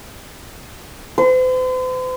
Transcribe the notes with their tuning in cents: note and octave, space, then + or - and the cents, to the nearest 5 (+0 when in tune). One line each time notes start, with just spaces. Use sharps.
C5 -45